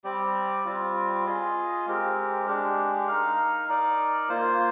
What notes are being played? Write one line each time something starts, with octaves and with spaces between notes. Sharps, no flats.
G3 C4 G4 D5
G3 C4 F4
F4 G#4 D#5
G#3 C4 G4 A#4
G#3 D4 G4
D#4 A#4 F5
D#4 A#4 D5
A#3 F4 C5